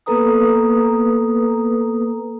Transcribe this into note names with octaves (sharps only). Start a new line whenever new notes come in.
A#3 B3 A4 B4 A#5 D#6